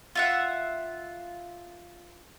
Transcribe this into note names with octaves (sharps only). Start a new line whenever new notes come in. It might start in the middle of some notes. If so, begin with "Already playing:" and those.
F4 E5 F#5